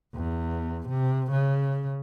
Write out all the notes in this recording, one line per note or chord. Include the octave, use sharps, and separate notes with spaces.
E2
C3
C#3